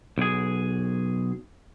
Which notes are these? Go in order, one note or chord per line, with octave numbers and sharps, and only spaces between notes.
B1 G#4